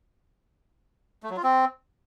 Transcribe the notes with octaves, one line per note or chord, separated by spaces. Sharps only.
A3
F#3
F4
C4